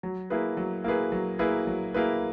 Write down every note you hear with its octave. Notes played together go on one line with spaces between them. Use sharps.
F#3
A#3 E4 G#4 B4
F#3
A#3 E4 G#4 B4
F#3
A#3 E4 G#4 B4
F#3
A#3 E4 G#4 B4